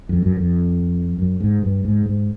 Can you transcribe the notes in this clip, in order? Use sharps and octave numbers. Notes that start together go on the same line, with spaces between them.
F2
F#2
F2
F#2
G#2
G2
G#2
G#2